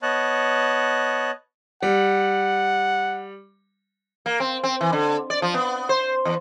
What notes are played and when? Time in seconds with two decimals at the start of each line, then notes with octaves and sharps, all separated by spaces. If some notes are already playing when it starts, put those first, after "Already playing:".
0.02 B3 C#5 D#5 A5 F#6
1.82 G3 F#5
4.26 A#3
4.40 C4
4.64 C4
4.81 E3
4.93 D3
5.30 D5
5.42 F3
5.54 B3
5.89 C5
6.25 E2